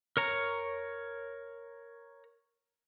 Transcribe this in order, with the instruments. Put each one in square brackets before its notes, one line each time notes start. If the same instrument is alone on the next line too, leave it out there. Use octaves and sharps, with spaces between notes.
[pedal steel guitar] A#4 C#5 A#5